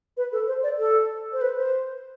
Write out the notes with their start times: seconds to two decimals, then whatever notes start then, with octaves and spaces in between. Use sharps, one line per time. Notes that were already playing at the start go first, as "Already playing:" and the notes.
0.17 B4
0.32 A4
0.47 C5
0.63 D5
0.79 A4
1.33 C5
1.41 B4
1.57 C5